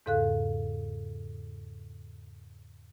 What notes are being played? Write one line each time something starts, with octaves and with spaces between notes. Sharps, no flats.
E2 G#2 C#3 A4 F5 F#6